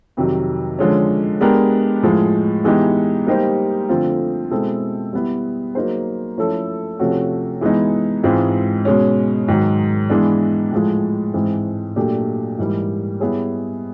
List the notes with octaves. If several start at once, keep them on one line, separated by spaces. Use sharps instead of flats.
F2 C3 D#3 F#3
D3 F3 G#3 C#4
G#3 B3 D4 G4 A#4
A2 F3 G#3
E3 G#3 B3 D#4 G4
G3 A#3 D#4 G4 C5
D3 F3 A3 C4 F4
B2 G#3 C4 E4 A4
G3 B3 E4
F#3 A#3 D#4 G#4 C5
F3 A3 C#4 E4 A4
C3 F3 A3 C#4 F#4
E3 G#3 B3 D#4
G#2 E3 G#3 C4 F4
B2 G#3 C#4
G#2 D#3 F#3
E3 G#3 B3 D4
A2 F3 G#3
G#2 E3 G#3 C4
A#2 F#3 A3 D4 G4
G#2 E3 G3 A#3
G3 B3 E4 G#4 C#5